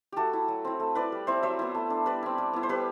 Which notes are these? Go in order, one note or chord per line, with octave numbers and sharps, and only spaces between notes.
A3 F#4 G4 A4
E4
F#3
C4 E4
A3
E4 B4 D5
G3
C4 E4 C5 E5
F#3 C5 E5
B3 E4
A3
D4
G3 B4 D5
C4 E4
G3
B3 E4
C5
G3 G4 B4